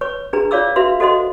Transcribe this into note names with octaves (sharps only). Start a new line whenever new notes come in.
B4 C#5 C#6
D4 G#4 B4 A#5
F4 C#5 D5 F5 D6 E6
F#4 B4 E5 F5 C6
F#4 A4 C5 D#5 F#5 C6